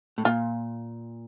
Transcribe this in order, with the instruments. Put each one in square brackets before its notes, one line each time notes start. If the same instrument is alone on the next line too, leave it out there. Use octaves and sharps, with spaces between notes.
[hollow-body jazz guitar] A2
[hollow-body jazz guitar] A#2 [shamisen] F4